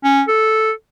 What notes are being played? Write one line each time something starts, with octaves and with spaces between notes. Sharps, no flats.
C#4
A4